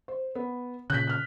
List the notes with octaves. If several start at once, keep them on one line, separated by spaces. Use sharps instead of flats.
C5
B3
A#2 C#3 F#6 G6 B6
F6 F#6